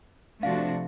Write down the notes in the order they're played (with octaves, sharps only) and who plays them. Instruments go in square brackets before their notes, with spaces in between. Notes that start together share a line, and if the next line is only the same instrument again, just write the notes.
[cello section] C3 F3 A3 D4 F#4 [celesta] F5